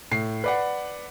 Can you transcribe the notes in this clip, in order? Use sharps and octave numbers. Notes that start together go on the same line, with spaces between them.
A2 C7
B4 D5 F#5